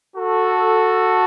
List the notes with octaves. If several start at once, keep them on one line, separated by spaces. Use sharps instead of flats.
F#4 A4